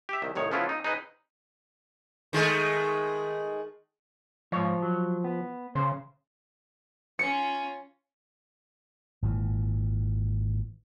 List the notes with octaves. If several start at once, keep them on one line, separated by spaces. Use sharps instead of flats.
G4 E5
C2 D#3
C2 A2 D#3 C#5
C#3 F3 B3 C#4 E4 F4
D#4
D#4 G#4 B4 D#5
D#3 G#3 A3
G#2 F3 C#5
F#3
B3
C#3 C5
C#4 F4 C#7
G#1 A#2 E3